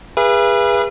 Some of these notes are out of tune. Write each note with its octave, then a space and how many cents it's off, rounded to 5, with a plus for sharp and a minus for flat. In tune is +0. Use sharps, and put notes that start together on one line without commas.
G#4 -25 B4 -25 E5 +45